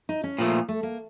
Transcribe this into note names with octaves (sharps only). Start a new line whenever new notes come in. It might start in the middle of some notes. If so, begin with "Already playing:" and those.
D#4
C#4
A#2 F3 A3
A3
A#3